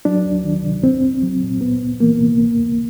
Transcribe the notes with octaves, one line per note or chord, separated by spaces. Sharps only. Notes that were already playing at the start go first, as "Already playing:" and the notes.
F#3 D4
D2
D#3
C3
C2 C4
C2
F#3
A#2
C#2 B3
C#2
E3 A#3
C3
C#2
C#2